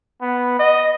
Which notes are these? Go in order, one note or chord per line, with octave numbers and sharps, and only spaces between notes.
B3
D#5